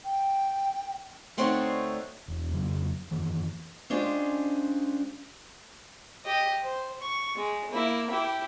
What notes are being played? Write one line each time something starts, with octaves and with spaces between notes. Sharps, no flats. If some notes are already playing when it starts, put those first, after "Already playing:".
G5
D2 A3 C4 D4 D#4 C#5
E1
F2 C#3 F#3
F#2 D#3 E3
G#3 C#4 D4 F4 G4 C5
G4 D#5
C5
C#6
G#3
A#3 E4
E4 G4